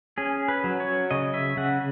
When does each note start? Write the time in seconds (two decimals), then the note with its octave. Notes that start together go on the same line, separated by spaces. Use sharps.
0.18 C#4 G#4
0.48 B4
0.64 F#3
0.80 C#5
1.11 C#3 D#5
1.34 E5
1.57 C#3 F#5